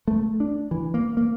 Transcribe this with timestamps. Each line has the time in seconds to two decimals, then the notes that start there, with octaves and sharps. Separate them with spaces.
0.08 A3
0.40 D4
0.71 E3
0.94 A#3
1.17 A#3